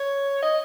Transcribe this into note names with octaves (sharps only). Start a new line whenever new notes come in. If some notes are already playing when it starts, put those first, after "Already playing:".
Already playing: C#5
D#5